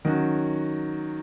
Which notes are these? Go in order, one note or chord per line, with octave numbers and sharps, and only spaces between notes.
D#3 F#3 C#4 F#4